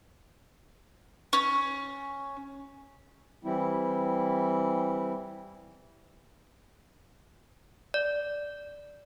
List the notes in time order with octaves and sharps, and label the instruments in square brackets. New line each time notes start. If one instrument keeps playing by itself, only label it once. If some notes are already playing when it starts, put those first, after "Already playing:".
[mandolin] C#4
[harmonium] E3 G3 C4 E4
[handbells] D5